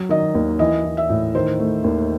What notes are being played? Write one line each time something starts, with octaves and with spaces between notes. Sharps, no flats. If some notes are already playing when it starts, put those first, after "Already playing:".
Already playing: F#3
D#3 D#5
D#2
E3 D#5
E3
E5
A2
D#3 C5
A3
D#2